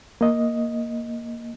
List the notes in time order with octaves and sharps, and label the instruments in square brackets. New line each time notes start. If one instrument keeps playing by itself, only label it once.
[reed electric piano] A#3 D#5